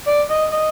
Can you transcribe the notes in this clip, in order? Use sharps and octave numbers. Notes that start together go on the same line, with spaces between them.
D5
D#5
D#5